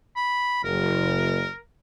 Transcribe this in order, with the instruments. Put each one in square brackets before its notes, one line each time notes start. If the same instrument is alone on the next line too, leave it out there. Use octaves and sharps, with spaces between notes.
[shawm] B5
[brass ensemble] F#1 [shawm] A#4